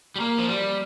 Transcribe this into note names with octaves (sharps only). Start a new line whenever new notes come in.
G3
A#3
F3
G3